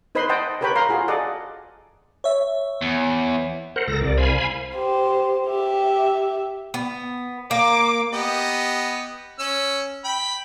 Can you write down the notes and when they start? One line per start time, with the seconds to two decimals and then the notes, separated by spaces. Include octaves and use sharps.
0.15 D#4 B4 C5 D#5 B5 C6
0.29 C5 D#5 F#5 G5 A5
0.61 G4 A#4 B4 C#5 G5 B5
0.76 A#4 F5 A#5 C6
0.89 F4 F#4 G#4
1.08 G#4 A4 D5 D#5 F#5
2.24 C#5 E5
2.82 E2
3.76 A#4 C5 F#5
3.88 C#2 A4 A#4 A#6
4.01 C2 D5
4.18 C5 F5 G#5 B5
4.74 G4 C5
5.47 G4 E5
6.74 B3
7.51 A#3 D6
8.13 B3 G4 D#5
9.39 C#4 E6
10.04 G5 B5